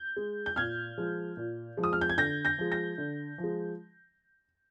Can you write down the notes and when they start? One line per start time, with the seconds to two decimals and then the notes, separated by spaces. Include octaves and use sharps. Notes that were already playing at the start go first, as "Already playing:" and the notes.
Already playing: G6
0.17 G#3
0.46 G6
0.56 A#2 F6 G#6
0.98 F3 G#3
1.37 A#2
1.77 F3 G#3
1.84 D#6
1.93 F6
2.01 G6
2.09 G#6
2.18 D3 G6 A#6
2.45 G6 A#6
2.58 F3 G#3
2.72 G6 A#6
2.98 D3
3.38 F3
3.44 G#3